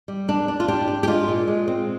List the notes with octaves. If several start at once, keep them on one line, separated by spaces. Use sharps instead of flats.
G3
A#3 D4
D4
F4
D4 G4
D4
G4
G#3 F4
A#2
G#3
C4